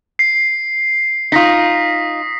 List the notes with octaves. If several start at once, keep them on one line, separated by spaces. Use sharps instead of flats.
C7
D#4 F4 D#6 A#6 B6